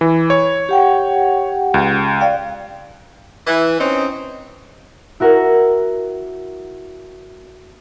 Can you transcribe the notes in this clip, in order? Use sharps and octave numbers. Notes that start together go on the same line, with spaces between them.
E3
C#5
G4 F#5 G5
C#2
D5 F5 G5
E3
C4 C#4 D#4
E4 F#4 A#4 F#5